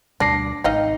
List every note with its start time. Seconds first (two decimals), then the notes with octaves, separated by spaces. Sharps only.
0.20 D2 B2 G3 D4 D6 A#6 C7
0.64 G#1 D#4 D#5 F5 G5